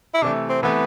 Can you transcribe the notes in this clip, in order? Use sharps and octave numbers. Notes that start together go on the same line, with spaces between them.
E4
C3 E3 A3 D4
C4
C3 E3 A3 B3